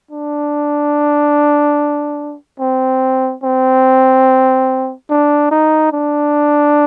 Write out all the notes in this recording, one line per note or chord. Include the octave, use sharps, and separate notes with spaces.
D4
C4
C4
D4
D#4
D4